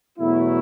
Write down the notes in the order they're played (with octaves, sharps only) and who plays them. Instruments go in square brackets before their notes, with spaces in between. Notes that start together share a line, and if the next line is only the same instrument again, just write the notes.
[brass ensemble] E2 B2 F#3 A3 E4